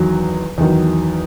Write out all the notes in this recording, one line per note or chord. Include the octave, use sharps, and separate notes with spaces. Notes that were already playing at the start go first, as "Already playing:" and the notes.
Already playing: E2 D#3 F#3
E2 D#3 F#3